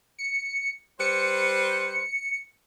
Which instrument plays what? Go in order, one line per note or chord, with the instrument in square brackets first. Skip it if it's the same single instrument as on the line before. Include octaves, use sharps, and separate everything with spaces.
[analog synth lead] C#7
[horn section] G3 B4 C5 [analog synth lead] C#7